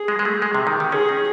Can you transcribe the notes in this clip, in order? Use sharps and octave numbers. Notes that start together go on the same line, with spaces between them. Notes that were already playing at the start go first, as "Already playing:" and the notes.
Already playing: G#4
G#3
G#3
A3
G#3
C3
D#3
D#3
C#4 G#4
D#4